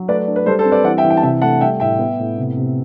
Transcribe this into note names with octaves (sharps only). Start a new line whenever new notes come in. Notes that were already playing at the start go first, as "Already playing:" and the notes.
Already playing: F#3
A3 B4 D5
D4
B4
G3 A4 C5
A4 C5
C4
B4 D5
E3 D5 F#5
E5 G5
E3
E5 G5
A5
C3 E5 G5
A3 F#5 A5
G3 E5 G5
A2 E5 G5
B3
A2
C3
C3